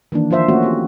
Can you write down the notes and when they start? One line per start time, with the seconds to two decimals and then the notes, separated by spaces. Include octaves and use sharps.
0.12 D#3 E3 A#3 D4
0.31 F3 F4 C5 E5
0.48 A3 A#3 C#4 F#4
0.63 C4 G4